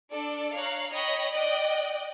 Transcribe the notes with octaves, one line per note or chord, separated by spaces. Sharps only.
D4 A4 D5
C#5 F5 A#5 F#6
C#5 D#5 G5 B5 A#6
D5 D#5 G5 F#6